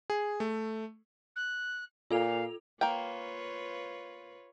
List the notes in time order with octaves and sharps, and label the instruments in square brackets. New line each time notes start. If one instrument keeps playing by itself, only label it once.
[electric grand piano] G#4
A3
[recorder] F#6
[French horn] A#2 [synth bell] F4 A4 F7 [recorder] F5
[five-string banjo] A#3 G5 [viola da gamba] F4 B4 C#5